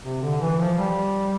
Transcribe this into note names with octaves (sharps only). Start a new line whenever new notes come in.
C3
D3
E3
F3
G3